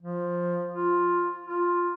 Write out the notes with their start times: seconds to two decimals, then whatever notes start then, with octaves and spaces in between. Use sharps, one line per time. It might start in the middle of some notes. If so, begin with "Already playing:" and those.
0.03 F3
0.74 F4
1.47 F4